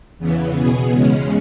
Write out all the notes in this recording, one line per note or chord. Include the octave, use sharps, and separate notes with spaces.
E2 C#3 E3 B3
B2 B3 G#4
E2 C#3 G#3 C#4